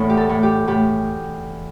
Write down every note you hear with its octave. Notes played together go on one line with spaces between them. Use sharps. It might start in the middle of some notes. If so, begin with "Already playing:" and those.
Already playing: E2 A2 E4
G4
A4
A2
G4
A2 G4